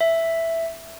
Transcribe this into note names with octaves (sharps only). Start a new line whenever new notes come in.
E5